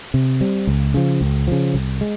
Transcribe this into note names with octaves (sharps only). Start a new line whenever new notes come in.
C3
G3 C4
C#2
C#3 F3
C#2
C#3 F3
C2
G#3